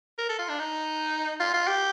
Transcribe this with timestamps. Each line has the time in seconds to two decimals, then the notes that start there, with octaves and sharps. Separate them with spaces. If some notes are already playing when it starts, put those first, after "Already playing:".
0.18 A#4
0.29 A4
0.39 F4
0.49 D4
0.59 D#4
1.40 F4
1.54 F4
1.68 G4